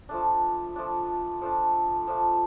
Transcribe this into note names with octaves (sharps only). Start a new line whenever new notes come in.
F3 A3 D4
F3 A3 D4
F3 A3 D4
F3 A3 D4